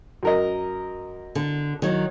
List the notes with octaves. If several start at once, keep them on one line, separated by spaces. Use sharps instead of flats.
F#2 A#4 D#5
D3
D#3 F#3